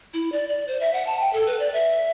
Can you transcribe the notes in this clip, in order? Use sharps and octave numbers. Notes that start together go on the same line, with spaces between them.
E4
D5
D5
C5
E5
F#5
A5
G5
A4
B4
D5
E5